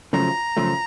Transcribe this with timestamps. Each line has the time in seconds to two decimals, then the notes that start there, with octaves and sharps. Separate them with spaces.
0.13 F#2 C#3 F3 A3 A#5
0.57 F#2 C#3 F3 A3